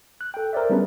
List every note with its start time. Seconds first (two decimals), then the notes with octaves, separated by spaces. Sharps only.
0.21 F#6
0.34 A4 G5
0.53 A#4 C5 D5 E5
0.70 G3 B3 C#4 D4 G#4 B4